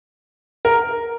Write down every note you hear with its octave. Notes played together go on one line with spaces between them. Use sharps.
A#4